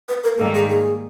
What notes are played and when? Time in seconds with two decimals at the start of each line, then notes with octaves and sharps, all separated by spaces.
0.09 B4
0.24 A#4
0.38 G#2 D#3 G3 A#3 D#4 A4
0.54 G#4
0.69 G#4